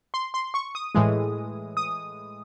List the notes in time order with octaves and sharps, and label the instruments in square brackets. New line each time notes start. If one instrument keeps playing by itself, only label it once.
[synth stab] C6
C6
C#6
D#6
A2 E3 G#3
D#6